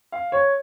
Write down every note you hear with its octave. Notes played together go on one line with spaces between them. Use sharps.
F5
C#5